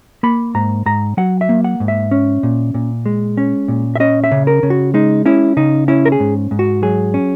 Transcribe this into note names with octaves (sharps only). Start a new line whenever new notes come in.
A#3 B5
G#2 A#5
G#2 A#5
F#3 F#5
E5
A#3
F#5
G#2
E5
C#4
A#2
A#2
G#3
C#4
A#2
E5
C#4 D#5
E5
C#3
A#4
C#3
F#4
G#3 D#4
C#4 E4
C#3 D#4
C#4 E4
A#4
G#4
G#2
G#2
F#4
F#3 G#4
C#4